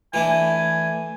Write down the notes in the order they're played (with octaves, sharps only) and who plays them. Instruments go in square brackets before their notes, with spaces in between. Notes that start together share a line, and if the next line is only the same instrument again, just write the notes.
[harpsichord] E3 A3 D4 [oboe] G#5